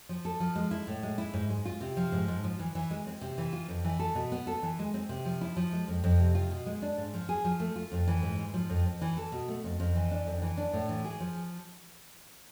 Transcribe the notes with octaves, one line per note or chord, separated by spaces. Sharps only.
F3
A4
F3
G#3
E4
A2
G#3
E4
G#2
G#3
F4
C3
F3
G#2
G#2
F3
E3
E3
G#3
C4
C3
E3
F4
F2
E3
A4
B2
B3
A4
E3
G#3
C4
C3
F3
E4
F3
G#3
F2
F2
C3
F4
B2
G#3
D4
G#2
F3
G#4
F3
A3
F4
F2
E3
G#2
G#2
F3
F2
F2
E3
A4
B2
A3
F2
F2
E3
D4
F2
E3
D4
A2
E3
G#4
F3